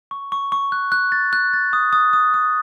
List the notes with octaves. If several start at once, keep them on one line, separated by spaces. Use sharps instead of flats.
C#6
C#6
C#6
F#6
F#6
A6
F#6
A6
D#6
D#6
D#6
D#6